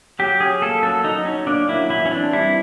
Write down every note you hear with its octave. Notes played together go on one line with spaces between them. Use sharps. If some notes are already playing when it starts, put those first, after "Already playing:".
F#3 G4
C#4 G#4
A#3 A4
F#3 A4
F#3 D#4
C#4
A#3 D4
F#3 E4
E3 E4
C#4
C4 D4
G3 E4